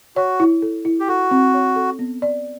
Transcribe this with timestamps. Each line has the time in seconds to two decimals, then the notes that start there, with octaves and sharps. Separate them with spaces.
0.16 F#4 C#5
0.40 E4
0.62 A4
0.85 E4
1.00 G4
1.08 F#4 A4
1.31 C4
1.54 C#5
1.76 A4
1.99 B3
2.22 D5